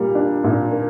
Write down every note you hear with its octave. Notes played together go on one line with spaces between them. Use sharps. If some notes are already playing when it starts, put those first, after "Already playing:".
Already playing: A#2 G3 A#3
D4
A#2
A#3